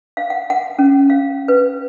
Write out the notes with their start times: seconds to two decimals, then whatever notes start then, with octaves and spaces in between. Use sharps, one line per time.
0.17 F5
0.30 F#5
0.50 F#5
0.79 C#4
1.10 F5
1.48 B4